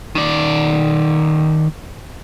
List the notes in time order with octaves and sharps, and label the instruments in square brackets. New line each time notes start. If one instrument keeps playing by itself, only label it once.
[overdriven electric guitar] D#3 D5